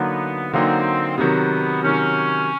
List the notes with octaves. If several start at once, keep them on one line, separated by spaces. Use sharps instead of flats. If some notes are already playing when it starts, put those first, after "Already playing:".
Already playing: D3 F#3 A#3 B3 D#4
D3 F#3 A#3 C4 D#4
C3 D#3 F#3 B3
C3 D#3 F#3 C#4